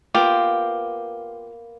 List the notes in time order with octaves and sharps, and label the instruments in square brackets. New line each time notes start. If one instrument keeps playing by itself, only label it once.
[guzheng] A#3 B3 C5 [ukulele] F4 [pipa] G4